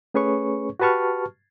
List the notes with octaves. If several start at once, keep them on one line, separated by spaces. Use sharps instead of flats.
A3 C#4 G#4 B4 C#5 C#6
F#4 G4 B4 A5 C#6 F6